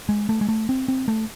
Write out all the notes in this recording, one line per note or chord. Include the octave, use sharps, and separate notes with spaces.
G#3
A3
G#3
A3
C4
C4
A3